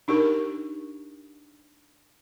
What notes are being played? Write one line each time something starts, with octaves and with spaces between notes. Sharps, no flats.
D4 D#4 G4 A#4